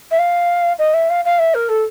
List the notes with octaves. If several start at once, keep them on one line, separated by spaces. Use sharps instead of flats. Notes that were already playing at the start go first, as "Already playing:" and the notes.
E5
F5
D#5
E5
F5
F5
E5
A#4
A4